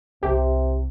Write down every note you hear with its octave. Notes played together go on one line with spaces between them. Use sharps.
C2 C3 G4